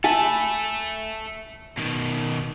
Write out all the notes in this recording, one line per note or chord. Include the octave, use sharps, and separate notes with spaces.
A4 E5 G#5 A5 B5
B2 D#3